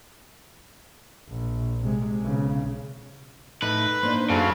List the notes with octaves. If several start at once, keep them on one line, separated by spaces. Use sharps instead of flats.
A#1
C3 G#3
B1 C#3
A2 D#4 B4
A#3 D4 D#4 C5
F#2 C#3 A4 F5